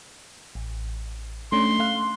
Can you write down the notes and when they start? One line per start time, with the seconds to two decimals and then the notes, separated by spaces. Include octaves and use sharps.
0.55 A1
1.52 A3 C#4 D4 C6
1.79 A3 F5 F#6